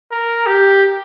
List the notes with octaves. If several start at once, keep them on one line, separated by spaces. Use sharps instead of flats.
A#4
G4